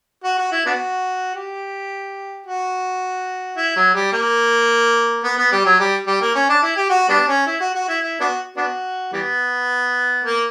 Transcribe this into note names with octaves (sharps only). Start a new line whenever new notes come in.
F#4
F#4
E4
B3 D4 F#4
G4
F#4
E4
F#3
G3
A#3
B3
B3
G3
F#3
G3
G3
A#3
C#4
D4
E4
G4
F#4
G3 B3 D4
C#4
E4
F#4
F#4
E4
E4
B3 D4 F#4
B3 D4 F#4
E3 G3 B3
A#3